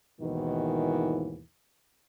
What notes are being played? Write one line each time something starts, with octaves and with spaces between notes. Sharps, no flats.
D#2 G#2 B2 D#3 E3